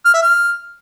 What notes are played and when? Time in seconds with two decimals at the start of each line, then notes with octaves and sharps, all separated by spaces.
0.05 F6
0.14 E5
0.23 F6